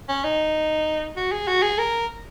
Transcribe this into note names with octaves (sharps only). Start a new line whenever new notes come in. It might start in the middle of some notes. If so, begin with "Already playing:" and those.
C#4
D#4
F#4
G#4
F#4
G#4
A#4